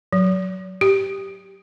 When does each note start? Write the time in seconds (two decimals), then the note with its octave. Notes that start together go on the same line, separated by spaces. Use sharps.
0.13 F#3
0.81 G4